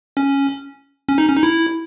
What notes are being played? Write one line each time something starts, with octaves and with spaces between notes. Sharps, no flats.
C#4
C#4
D#4
C#4
D#4
E4